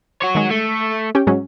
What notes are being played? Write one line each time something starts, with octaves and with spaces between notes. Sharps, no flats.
F#4 C#5
D#3 G#3
A3
C#4 G4 G5
G#2 F#3 C#4